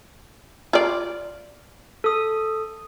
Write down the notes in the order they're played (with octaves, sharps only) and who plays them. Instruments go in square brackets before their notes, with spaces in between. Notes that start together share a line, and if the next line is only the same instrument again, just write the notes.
[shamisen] F4 D5
[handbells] A4 D#6